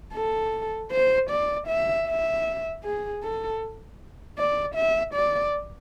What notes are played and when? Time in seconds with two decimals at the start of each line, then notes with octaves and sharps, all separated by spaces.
0.14 A4
0.92 C5
1.30 D5
1.68 E5
2.07 E5
2.84 G#4
3.23 A4
4.38 D5
4.76 E5
5.15 D5